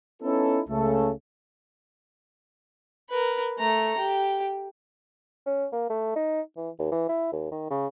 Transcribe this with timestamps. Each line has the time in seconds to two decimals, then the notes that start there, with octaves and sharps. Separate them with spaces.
0.23 B3 C#4 D#4 E4 A4
0.69 C#2 C#3 A3 A4
3.10 A#4 B4
3.59 A3 A#5
3.98 G4
5.46 C#4
5.73 A#3
5.90 A3
6.16 D#4
6.57 E3
6.79 D#2
6.92 E3
7.09 E4
7.32 D#2
7.52 D#3
7.70 C#3